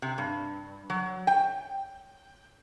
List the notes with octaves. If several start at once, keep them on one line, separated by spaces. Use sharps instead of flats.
C3
G2
F#3
G5